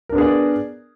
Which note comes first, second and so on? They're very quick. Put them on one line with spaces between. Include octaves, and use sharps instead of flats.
A#4 D4 B3 G#4 D5